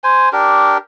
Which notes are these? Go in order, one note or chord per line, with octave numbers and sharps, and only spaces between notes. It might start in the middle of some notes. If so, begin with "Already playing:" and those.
C5 G#5
D4 G4 A#4